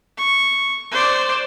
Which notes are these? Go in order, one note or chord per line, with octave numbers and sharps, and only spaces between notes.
C#6
C5 D5